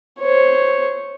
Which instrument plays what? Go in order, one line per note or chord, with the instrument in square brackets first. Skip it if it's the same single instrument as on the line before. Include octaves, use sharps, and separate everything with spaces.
[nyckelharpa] C5 C#5